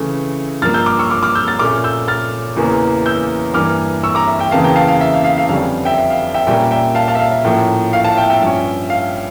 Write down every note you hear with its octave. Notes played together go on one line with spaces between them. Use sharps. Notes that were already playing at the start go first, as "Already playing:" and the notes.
Already playing: C#3 E3 A3
G2 F3 A#3 F6 A6
E6 G6
D6 F6
C#6 E6
D6 F6
D6 F6
E6 G6
F6 A6
A#2 A3 C#4 D6 F6
E6 G6
F6 A6
E2 C#3 E3 A#3 C#4
E6 G6
G2 E3 A#3 D6 F6
C#6 E6
A#5 D6
E5
E5 G5
E2 C#3 E3 A#3 F5 A5
G5 A#5
F5 A5
F5
E5
F5
F5
F5
F2 D3 G3 C#4 F5
E5 G5
E5
F5
E5 G5
A#2 G3 A#3 C#4 E5 G5
E5 G5
F5 A5
F5 A5
E5
F5
E5
A2 F3 A#3 C#4
F5
F5 A5
E5 G5
E5 G5
G2 F3 C#4
F5